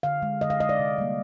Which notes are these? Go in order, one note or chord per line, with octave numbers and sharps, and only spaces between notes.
D3 F5
G#3
D3 D#5
F5
G#3 D#5
D5
C3
G3 A#3